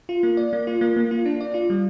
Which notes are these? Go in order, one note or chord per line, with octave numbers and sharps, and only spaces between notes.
F4
A#3
D5
A#3
F4
A#3
A#3
F4
D4
D5
F4
G3